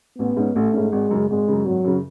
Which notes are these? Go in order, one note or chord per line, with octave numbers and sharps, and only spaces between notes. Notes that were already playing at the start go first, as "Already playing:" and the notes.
A1 B3
G#2 G#3 C#4
A1 A3
G#2 G#3 C#4
G#1 G#3
F#2 C#3
G#1 G#3
F#2 C#3
G#1 F#3
F#2 C#3